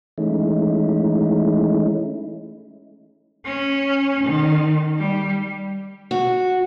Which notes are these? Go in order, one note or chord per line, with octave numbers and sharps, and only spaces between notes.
E3 G#3 A3 C#4 D#4 E4
C#4
D#3
G3
F#4